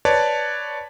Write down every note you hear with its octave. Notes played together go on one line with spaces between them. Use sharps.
B4 C#5 D5 A5